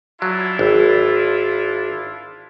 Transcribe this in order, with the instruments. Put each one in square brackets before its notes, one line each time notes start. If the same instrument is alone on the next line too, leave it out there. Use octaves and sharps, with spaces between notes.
[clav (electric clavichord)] F#3 [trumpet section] D4 E4 F4
[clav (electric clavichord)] G#1